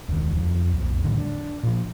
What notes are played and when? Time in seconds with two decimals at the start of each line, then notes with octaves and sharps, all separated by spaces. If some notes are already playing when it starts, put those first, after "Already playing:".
0.08 E1 C#2 D3 D#3
0.35 F2 F3
0.72 B1 F2
1.04 A2 D3 D#3 G3
1.18 D4
1.63 A#2 F3